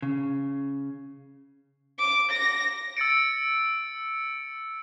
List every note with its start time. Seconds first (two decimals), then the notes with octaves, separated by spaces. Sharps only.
0.02 C#3
1.99 D6
2.31 A#6
2.97 E6 A6 C#7 D7